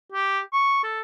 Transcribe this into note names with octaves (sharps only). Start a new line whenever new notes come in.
G4
C#6
A4